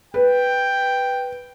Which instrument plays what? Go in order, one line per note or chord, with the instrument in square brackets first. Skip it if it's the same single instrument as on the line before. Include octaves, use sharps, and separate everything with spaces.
[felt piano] B4 [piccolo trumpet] G5